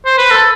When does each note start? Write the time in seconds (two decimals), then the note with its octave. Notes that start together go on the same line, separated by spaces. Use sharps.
0.06 C5
0.18 B4
0.31 A4